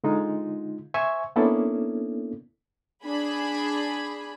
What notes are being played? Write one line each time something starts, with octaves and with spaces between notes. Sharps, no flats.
D3 G#3 D#4 F4
C5 E5 G#5 C#6
A#3 B3 C#4 D4 E4 A4
D4 G#4 B5